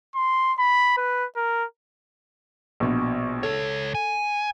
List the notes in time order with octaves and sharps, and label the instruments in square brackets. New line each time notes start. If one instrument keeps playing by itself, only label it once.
[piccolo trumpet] C6
B5
B4
A#4
[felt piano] A#1 B2
[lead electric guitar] C#2 C#5 [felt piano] A4
[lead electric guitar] G#5